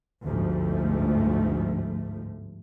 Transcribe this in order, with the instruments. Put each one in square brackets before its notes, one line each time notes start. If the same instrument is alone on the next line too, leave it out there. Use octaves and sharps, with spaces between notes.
[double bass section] G1 D2 G#2 F3 A3